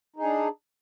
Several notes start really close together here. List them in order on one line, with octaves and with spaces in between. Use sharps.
D#4 G#4 D4